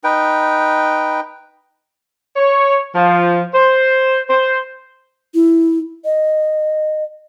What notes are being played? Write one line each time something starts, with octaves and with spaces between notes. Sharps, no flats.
D#4 B4 G5
C#5
F3
C5
C5
E4
D#5